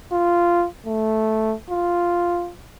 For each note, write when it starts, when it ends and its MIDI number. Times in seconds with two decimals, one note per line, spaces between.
0.12 0.66 65
0.86 1.54 57
1.70 2.51 65